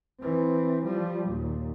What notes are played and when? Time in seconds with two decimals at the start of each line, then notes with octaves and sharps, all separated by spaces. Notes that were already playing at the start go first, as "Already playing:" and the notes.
0.21 E3 C4
0.85 F3 G3
1.28 D#2 A#2